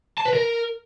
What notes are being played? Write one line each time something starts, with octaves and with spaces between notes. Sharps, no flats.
A5
B4
A#4